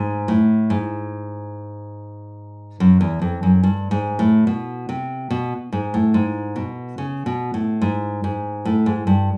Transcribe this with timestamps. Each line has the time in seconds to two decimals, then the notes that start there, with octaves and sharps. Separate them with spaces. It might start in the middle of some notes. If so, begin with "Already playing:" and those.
Already playing: G#2
0.28 A2
0.70 G#2
2.80 F#2
3.01 E2
3.22 F2
3.43 F#2
3.63 G2
3.91 G#2
4.19 A2
4.47 B2
4.89 C3
5.30 B2
5.72 G#2
5.94 A2
6.14 G#2
6.56 B2
6.98 C#3
7.26 B2
7.54 A2
7.81 G#2
8.24 G#2
8.65 A2
8.86 G#2
9.07 G2